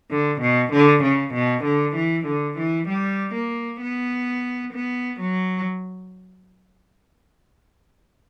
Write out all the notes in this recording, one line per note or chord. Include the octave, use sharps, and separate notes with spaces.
D3
B2
D3
C#3
B2
D3
E3
D3
E3
G3
A#3
B3
B3
F#3